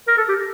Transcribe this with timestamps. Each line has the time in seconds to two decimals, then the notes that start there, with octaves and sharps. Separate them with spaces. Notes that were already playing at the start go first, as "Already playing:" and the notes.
0.08 A#4
0.17 A4
0.29 G4